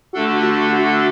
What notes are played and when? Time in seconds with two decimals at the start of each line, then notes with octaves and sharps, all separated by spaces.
0.13 D3 A3 D4 F#4 A4
0.43 F#4
0.72 F#4